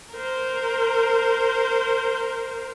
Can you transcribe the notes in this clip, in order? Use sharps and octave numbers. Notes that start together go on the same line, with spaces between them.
A#4 C5